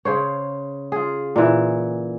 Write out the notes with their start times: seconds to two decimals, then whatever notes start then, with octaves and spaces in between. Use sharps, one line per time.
0.05 C#3 C5 C#5
0.92 F4 G#4
1.36 A#2 E3